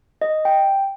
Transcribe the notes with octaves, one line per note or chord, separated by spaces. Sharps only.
D#5
G5